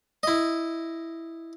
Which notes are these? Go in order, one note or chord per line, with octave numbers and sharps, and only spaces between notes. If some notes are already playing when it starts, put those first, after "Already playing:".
E4 D#5